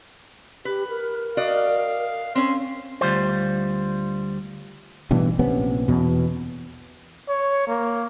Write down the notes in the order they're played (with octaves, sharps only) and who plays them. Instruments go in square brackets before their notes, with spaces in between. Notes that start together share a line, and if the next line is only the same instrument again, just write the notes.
[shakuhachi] G4 [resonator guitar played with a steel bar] B4
[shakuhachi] A#4
[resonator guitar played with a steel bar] F#4 D5 D#5 [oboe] F5
[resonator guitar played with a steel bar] C4 C#4 [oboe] C6
[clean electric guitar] D2 G3 F4 C5
[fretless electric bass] A1 G2 B2 E3
A#1 C3 B3 C#4
E2 B2
[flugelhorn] C#5
A#3